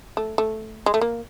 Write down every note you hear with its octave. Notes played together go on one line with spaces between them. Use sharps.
A3
A3
G#3
A3
A#3